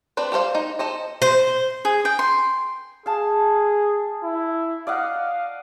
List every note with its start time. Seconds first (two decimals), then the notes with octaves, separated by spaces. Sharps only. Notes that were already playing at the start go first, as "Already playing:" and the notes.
0.17 C4 D4 B4 C5
0.32 G4 A4 A#4 C5 F5
0.55 D#4
0.79 A4 C5 D#5
1.22 C5
1.85 G#4
2.05 G5
2.19 C6
3.06 G#4 F5 A5
4.23 E4
4.87 D5 D#5 F5 F#5